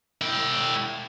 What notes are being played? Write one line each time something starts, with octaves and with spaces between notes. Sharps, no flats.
E4 G5